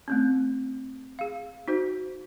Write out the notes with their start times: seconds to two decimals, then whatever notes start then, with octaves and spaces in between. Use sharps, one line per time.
0.08 A3 C4 C#4
1.19 G#4 F5
1.68 D#4 F#4 C5